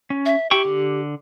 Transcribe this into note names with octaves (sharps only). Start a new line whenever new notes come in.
C#4
E5
E4 G4 G5 C#6
D3